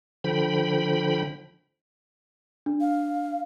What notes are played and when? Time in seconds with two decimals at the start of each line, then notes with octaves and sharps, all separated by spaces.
0.24 D3 F3 G5 B5
2.66 D4
2.81 F5